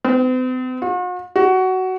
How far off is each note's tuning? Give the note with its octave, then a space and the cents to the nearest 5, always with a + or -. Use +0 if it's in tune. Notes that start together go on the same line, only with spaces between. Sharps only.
C4 -45
F#4 -45
F#4 +15